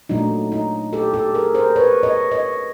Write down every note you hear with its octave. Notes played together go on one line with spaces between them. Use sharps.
A#2 F#3 A3 D4 D#4
D#4
G4 A4
G4 A4
G#4 A#4
A#4 C5
B4 C#5
C#5 D#5
C#5 D#5